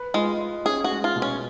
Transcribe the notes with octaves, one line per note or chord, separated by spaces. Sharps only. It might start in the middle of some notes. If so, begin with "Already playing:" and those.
Already playing: B4
G#3 F4
D#5
C#4 G#4
F#4
G#3
F4
B2
C#4